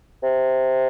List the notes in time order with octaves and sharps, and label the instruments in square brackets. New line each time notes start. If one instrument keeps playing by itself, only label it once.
[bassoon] C3